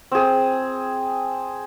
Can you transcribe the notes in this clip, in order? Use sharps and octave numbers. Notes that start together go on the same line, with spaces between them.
C4 G#4